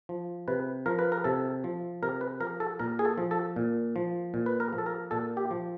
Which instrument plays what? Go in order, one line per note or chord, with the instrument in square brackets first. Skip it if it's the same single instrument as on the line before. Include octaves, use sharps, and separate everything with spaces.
[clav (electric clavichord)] F3
C3 B4
F3 A#4
B4
A#4
C3 A4
F3
C3 A#4
B4
F3 A#4
A4
A#2 A#4
G#4
A4
F3
A4
A#2
F3
A#2
B4
A#4
F3
A4
A#4
A#2 A4
G4
F3